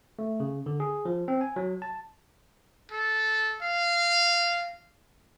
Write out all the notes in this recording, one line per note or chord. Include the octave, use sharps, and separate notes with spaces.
A3
C#3
D3
G#4
F3
C4
G#5
F#3
A5
A4
F5